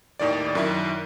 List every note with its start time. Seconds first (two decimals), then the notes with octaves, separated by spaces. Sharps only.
0.19 D#2 A2 D#3 D5
0.55 F#2 D#3 E4